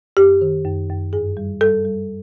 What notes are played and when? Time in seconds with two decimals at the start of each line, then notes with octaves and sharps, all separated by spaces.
0.17 F#2 G4
0.41 D#3
0.65 F#2
0.89 F#2
1.13 G2 G#4
1.37 G3
1.61 G3 A4
1.85 G3